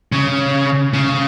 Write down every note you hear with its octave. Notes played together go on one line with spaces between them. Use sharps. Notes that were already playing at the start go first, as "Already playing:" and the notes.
C#3
C#3